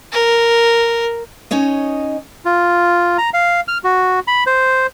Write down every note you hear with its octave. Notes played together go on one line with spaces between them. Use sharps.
A#4
C#4 D#4 C#5 D#5
F4
A#5
F5
F6
F#4
B5
C5